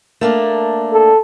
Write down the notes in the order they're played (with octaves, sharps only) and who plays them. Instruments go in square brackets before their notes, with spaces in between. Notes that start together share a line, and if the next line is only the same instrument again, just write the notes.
[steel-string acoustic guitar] A3 A#3 D4
[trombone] A4